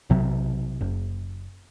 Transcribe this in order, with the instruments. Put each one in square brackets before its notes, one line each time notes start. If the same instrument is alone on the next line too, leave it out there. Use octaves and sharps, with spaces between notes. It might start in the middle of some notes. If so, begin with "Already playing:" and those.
[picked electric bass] B1 C3 F#3
F#1